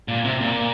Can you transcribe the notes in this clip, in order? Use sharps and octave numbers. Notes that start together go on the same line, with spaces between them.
A#2
C3
A#2